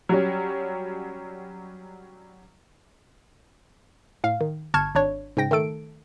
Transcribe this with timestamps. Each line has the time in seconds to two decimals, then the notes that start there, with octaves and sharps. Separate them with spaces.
0.09 F#3 G3 C#4
4.24 A2 F5
4.41 D#3
4.74 G1 A5 C#6 F6 G#6
4.95 G#1 D4 C#5
5.37 G#2 C#3 G5 A#6
5.51 D#3 A3 A4 D7